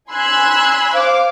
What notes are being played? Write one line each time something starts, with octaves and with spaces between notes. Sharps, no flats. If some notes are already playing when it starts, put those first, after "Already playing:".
G#5 B5 C6 E6 F#6 G#6
C5 F5 D6